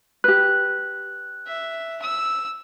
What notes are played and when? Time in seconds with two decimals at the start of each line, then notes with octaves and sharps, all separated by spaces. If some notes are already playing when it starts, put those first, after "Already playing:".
0.24 G4 B4 F#6
1.47 E5
2.02 E6